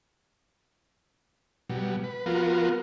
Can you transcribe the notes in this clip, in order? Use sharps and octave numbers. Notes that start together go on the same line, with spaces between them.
B2 F#3 G3
B4
F3 B3 F4 F#4 A#4